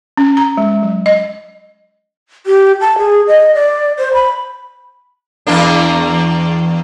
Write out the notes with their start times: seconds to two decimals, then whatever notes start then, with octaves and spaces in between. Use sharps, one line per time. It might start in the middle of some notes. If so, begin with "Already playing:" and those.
0.17 C#4
0.37 A#5
0.57 G#3
0.83 F#3
1.06 D#5
2.46 G4
2.81 A5
2.98 G#4
3.28 D#5
3.55 D5
3.99 C5
4.14 B5
5.47 E2 A#3 D4